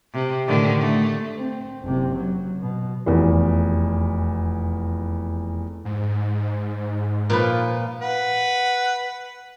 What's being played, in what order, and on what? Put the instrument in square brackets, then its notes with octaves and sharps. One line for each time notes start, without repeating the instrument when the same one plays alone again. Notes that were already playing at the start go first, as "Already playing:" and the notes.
[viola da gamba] C3
A2 D3 D#3
A3
[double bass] C4
F#1 C3
F#3
B2
[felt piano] F1 E2
[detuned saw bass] G#2
[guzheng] A#2 F3 B4
[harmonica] B4 F#5